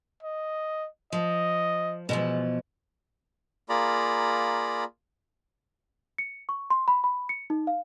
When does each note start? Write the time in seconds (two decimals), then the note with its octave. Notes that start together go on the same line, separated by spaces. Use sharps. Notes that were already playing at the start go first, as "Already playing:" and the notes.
0.23 D#5
1.12 F3 D#5
2.09 B2 E3 F3 G#3
3.69 A#3 F4 G#4 D5 A#5 B5
6.18 C#7
6.49 C#6
6.70 C6
6.88 B5
7.04 B5
7.29 C#7
7.50 D#4
7.67 F5